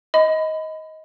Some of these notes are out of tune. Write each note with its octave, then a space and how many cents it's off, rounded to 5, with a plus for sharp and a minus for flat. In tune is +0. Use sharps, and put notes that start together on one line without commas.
D#5 +20 B5 +25